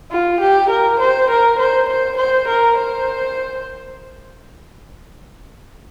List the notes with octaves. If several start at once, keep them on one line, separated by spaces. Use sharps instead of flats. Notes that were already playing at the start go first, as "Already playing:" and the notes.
F4
G4
A#4
C5
A#4
C5
C5
C5
A#4
C5